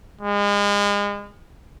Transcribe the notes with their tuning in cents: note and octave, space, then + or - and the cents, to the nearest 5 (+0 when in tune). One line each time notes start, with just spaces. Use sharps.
G#3 -35